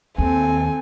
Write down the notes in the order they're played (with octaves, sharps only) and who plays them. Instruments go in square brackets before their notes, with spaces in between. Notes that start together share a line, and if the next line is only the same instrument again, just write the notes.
[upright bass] D#2 [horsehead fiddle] C4 A4 [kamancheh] G#5